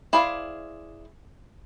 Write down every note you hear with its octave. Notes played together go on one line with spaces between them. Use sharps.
E4 G#4 C5 D5 F5